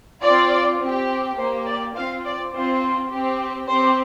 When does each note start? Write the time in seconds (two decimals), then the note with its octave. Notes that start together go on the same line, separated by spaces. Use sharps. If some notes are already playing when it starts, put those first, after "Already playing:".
0.23 C4 F4 D5
0.81 C4 G4
1.38 A#3 G4 C5
1.68 D5
1.96 C4 F4 C5 F5
2.25 D5
2.53 C4 F4 C5
3.11 C4 G4
3.68 C4 G4 C5